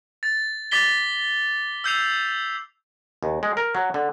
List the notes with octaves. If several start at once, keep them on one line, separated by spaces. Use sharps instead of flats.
A6
D6 A6 B6 G7
E6 G6 C7 F7
D#2
G#3
A#4
F#3
D3